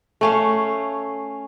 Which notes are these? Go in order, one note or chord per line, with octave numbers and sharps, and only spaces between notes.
A3 C#4 F5